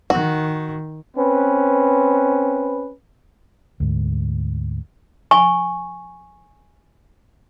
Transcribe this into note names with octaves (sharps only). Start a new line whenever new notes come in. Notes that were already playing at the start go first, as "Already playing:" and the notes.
D#3 F#4
C4 C#4 B4
D2 G#2
G#5 C#6